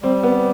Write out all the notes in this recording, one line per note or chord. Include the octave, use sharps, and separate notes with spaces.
G3 C4
B3